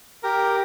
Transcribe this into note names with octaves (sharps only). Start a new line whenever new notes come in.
G4 A#4